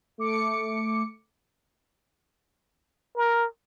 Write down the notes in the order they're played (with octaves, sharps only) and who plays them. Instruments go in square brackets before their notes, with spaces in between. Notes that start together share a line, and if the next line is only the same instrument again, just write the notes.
[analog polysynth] A3 D6 C#7
[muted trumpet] A#4